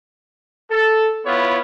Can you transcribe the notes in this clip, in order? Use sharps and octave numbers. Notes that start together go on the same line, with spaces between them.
A4
B3 E4 F4 C#5